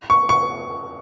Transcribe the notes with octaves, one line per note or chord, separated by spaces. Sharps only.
C#6
C#6